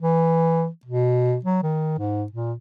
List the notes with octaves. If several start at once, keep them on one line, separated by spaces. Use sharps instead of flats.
E3
B2
F#3
D#3
G#2
A#2